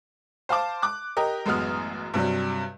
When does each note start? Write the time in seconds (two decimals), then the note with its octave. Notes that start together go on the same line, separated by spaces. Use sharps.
0.49 C5 F5 A5 D6
0.82 D6 F#6
1.17 G4 A#4 D#5
1.46 A1 F#2 G#3 B3 D#6 F6
2.14 G2 C3 F#3 G3